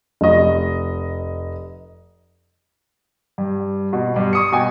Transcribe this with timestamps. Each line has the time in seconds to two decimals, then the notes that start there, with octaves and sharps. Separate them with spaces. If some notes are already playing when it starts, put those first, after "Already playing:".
0.21 F1 D#5
3.38 G2
3.93 B2
4.16 G2
4.33 C#6 D#6 C#7
4.52 B2 G5 G#5